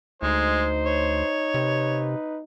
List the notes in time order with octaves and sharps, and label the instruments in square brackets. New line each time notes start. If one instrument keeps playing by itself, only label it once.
[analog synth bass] D2 [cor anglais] G#3 [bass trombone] D#4 [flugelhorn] C5
[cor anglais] C#5
[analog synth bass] C3 [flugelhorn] B4